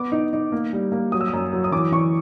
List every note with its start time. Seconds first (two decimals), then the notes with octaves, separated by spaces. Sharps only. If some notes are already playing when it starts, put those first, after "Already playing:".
Already playing: B3 D6
0.12 D#4
0.33 D#4
0.52 A#3
0.73 G3
0.92 A#3
1.12 F#3 D#6
1.21 E6
1.28 D#6
1.33 F#2
1.53 F#3
1.64 D#6
1.72 E3 D6
1.92 E3 C#6